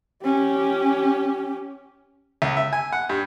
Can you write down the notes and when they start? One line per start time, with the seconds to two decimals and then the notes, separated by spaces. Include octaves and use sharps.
0.24 C#4 G4
2.42 C#2
2.57 E5
2.73 G#5
2.93 F#5
3.09 G2